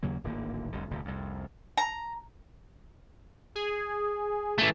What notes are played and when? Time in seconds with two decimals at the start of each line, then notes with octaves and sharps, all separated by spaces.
0.03 D#2 C#3 F#3 A#3
0.24 D1 G#1 D3 A#3
0.72 F1 C2 D3
0.90 D#1 D2 C3
1.05 C2 F2
1.77 A#5
3.55 G#4
4.58 E3 A3